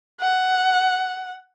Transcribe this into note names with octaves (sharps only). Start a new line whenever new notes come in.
F#5